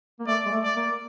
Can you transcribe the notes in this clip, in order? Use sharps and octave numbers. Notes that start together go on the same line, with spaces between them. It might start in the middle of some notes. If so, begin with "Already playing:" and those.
A#3
A3 D5
G#3
A3
D5
A#3